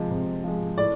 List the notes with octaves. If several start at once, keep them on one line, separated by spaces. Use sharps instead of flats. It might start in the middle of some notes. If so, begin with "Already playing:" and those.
Already playing: C3 F3 G#3
C3
F3 G#3
A2 D5